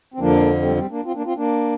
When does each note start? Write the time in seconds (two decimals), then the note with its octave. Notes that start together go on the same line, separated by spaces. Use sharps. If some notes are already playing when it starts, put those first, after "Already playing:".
0.14 C4
0.20 F2 D3 F3 A#3 D4
0.62 G3 C4
0.76 G3 C4
0.91 A#3 D4
1.05 C4 F4
1.15 A#3 D4
1.26 C4 F4
1.37 A#3 D4